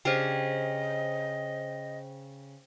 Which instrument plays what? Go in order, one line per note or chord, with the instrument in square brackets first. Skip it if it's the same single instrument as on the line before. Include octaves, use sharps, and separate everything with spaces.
[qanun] C#3 D4 G4 [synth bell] C5 G5 [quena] D#5